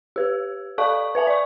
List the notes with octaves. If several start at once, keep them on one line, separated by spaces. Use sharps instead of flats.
G4 B4
A4 D5 F5 A5 C#6
B4 E5 G#5 A5
D5 C#6